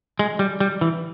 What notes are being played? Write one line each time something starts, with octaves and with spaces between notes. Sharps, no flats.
G#3
G3
G3
E3